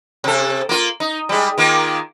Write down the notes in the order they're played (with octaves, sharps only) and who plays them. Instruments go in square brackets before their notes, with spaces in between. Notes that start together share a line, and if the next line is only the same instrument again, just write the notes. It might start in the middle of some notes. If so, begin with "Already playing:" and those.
[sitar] C3 A4
A#3 F4
D#4
G3 G#3
D#3 A#3 F4